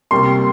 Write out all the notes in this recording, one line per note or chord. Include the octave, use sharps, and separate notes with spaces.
C3 G3 A#3 C6